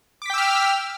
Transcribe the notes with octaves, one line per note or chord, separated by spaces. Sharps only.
G5 D6 E6 F6 B6